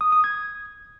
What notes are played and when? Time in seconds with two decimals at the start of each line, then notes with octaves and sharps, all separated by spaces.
0.01 D#6
0.12 D#6
0.24 G#6